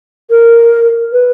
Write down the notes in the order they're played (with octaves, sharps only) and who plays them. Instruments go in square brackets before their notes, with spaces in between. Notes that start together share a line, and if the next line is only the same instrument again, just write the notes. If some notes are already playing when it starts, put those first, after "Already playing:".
[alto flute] A#4
B4